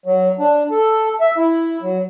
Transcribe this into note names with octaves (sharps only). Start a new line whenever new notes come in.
F#3
D4
A4
E5
E4
F#3